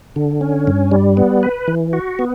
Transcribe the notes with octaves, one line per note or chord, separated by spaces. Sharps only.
D3
C#4
G2
G3
B3
B4
E3
F#4
B3